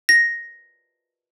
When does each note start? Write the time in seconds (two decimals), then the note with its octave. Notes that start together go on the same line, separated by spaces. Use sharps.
0.09 A#6